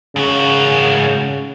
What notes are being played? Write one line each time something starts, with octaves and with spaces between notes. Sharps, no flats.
G#2 C#3 F#4